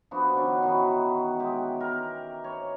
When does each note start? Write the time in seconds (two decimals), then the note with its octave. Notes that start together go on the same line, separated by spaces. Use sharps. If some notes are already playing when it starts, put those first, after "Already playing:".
0.11 F3 B3 D4 F#4
0.34 B2 D#3 C#4 D4
0.63 D#3 E3 F#4
1.40 G#3 G4
1.80 A#4
2.44 C#5